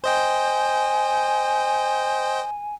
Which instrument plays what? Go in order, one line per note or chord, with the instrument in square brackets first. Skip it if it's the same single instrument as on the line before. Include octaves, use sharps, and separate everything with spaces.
[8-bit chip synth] C5 D#5 G5 [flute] G#5